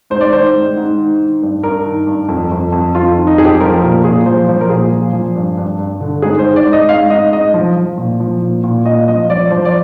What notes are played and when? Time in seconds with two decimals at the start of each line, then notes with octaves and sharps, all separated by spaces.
0.10 G#2 C5
0.21 D5
0.32 D#3 C5
0.55 G#2
0.77 G#2
0.98 D#3
1.20 D#3
1.42 G2
1.63 G2 A#4
1.86 D#3
2.07 G2
2.29 F2
2.52 F2
2.72 F2
2.95 F2 F4
3.17 D#3
3.27 D#4
3.38 F2 G#4
3.45 G4
3.61 F3 A#4
3.82 A#2 A#4
4.04 A#2 G#4
4.26 F3 C5
4.48 F3 C5
4.61 A#4
4.70 A#2 G#4
4.92 F3
5.13 F3
5.35 G2
5.57 G2
5.79 G2
6.01 D3
6.22 G#2 G#4
6.39 C5
6.45 D#3
6.56 D5
6.67 G#2
6.73 D#5
6.88 G#2 F5
7.10 G#2 D#5
7.33 G#2 D#5
7.54 F3
7.76 F3
7.98 A#2
8.20 F3
8.41 A#2
8.64 A#2
8.85 A#2 D#5
9.08 F3 D#5
9.30 F3 D5
9.51 F3 C5
9.65 D5